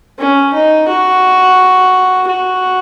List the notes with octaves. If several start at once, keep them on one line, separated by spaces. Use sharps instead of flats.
C#4
D#4
F#4
F#4